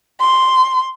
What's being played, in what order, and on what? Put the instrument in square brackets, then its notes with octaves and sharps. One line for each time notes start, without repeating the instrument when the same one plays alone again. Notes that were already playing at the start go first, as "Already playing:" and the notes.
[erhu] C6